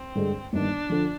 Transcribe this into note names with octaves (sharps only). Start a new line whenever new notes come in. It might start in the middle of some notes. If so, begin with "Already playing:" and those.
Already playing: C4
G2 D3 G#3
G1 G2 D#3 G3 A#3 D4
D3 F3